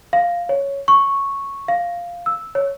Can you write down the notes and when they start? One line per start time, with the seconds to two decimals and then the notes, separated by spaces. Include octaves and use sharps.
0.13 F5
0.49 C#5
0.88 C#6
1.68 F5
2.26 E6
2.55 C#5